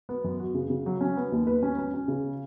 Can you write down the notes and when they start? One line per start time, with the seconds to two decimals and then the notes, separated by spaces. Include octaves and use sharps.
0.09 B3
0.24 F#2
0.40 F#4
0.54 C#3
0.70 C#3
0.86 F#3
1.01 C#4
1.17 B3
1.32 D#2
1.47 B4
1.63 C#4
1.78 C#4
1.94 C#4
2.08 C#3